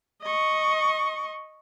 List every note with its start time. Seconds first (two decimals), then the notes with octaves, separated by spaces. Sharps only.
0.23 D#5 C#6